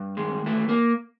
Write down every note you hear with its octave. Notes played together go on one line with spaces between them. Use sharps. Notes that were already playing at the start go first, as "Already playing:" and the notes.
Already playing: G2
D#3 G#3
E3 A3
A#3